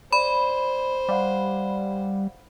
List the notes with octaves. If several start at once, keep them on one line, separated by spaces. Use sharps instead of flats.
C5 D5 B5
G3 D5 F5 F#5